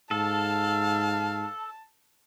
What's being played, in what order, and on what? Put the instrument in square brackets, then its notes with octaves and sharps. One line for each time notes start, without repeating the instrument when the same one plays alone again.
[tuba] G#2 [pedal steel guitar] A4 [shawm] F5 [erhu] A5